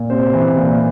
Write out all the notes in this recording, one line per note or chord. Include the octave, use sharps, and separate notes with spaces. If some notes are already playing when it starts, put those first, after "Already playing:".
Already playing: A#2
C3 C5
E3
A#2